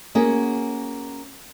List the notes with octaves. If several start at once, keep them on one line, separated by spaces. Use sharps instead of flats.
A#3 C#4 F#4 G#4